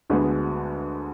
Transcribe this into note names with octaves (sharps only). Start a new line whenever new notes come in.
D2 D3 G#3 B3